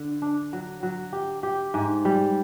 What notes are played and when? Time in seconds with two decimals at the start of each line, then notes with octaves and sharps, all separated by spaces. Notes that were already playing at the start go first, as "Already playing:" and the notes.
Already playing: D3
0.22 D4
0.53 F#3
0.83 F#3
1.13 G4
1.43 G4
1.74 G#2
2.05 G3